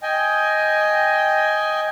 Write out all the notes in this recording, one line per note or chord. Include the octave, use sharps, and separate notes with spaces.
D#5 G5 G#5